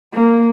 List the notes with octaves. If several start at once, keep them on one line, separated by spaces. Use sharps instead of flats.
A#3